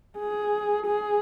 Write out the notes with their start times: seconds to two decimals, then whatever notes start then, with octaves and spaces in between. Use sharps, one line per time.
0.18 G#4
0.87 G#4